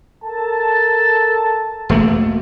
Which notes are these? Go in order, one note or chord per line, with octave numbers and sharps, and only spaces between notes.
A4 A#4 A5
E1 A3 A#3